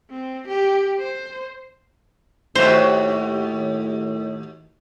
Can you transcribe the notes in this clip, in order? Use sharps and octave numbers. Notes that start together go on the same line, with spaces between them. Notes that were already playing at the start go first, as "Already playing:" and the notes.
C4
G4
C5
D#2 A2 F#3 F#4 G4 C5 C#5 E5